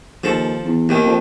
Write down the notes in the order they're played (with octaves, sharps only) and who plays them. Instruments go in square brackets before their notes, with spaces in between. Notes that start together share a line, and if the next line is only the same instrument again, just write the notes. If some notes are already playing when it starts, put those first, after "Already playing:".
[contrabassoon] D#2 [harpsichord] F3 A4
[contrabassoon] E2
[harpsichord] D#2 D#3
[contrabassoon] F2